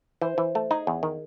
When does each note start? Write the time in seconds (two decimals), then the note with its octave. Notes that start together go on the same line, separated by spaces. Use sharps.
0.22 E3 C5
0.38 E3
0.55 A3
0.71 D#4 G#4
0.87 E2
1.03 D#3